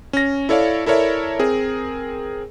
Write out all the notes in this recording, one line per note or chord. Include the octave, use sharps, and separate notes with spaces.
C#4 A#6
E4 A4 C#5 D5 F5
E4 A4 A#4 C#5 D5 E5
C4 G#4 A#4